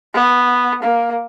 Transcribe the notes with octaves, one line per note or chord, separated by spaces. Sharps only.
B3
A#3